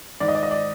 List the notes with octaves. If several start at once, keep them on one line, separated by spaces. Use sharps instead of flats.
G#2 D#3 D5
D#5
D5
D#5
D5